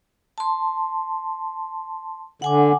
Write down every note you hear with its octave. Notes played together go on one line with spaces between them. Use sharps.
A5 C6
D3 F#5 G#5 D6